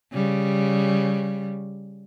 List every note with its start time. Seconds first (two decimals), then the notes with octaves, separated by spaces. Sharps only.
0.13 C#3 G3